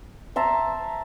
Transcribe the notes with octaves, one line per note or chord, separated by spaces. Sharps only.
C5 E5 A5 A#5